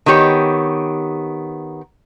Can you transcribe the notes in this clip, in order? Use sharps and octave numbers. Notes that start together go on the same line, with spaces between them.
D#3 B3 G4 C#5